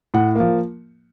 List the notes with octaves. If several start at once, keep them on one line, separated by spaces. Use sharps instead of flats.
A2 F#5
F3 A#3